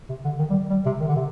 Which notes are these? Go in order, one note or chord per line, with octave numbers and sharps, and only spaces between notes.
C3
D3
D#3
G3
G3
C3
D#3
D3
C3